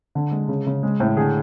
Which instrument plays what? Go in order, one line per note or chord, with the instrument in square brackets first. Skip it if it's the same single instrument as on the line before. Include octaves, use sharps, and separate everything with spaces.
[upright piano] D3
G#3
C#3
C#3
G#3
A2
D3 G#4